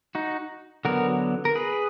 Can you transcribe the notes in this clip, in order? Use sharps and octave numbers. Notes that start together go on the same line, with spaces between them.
D#4 F#4
D3 F#3 B3 F#4 A#4
A#4
G#4 B4